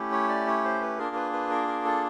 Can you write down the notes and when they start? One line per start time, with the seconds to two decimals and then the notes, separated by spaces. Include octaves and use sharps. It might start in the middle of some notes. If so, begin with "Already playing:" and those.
Already playing: A3 C#4 E4 G4
0.12 C#5
0.29 D5
0.47 C#5
0.64 C5
0.81 B4
0.98 A#3 D4 F4 G#4 A#4
1.16 B4
1.33 B4
1.50 A#4
1.67 A#4
1.85 A4